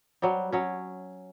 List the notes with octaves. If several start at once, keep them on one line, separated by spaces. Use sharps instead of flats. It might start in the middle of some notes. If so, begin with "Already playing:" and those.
F#3 G3
F#3 C#4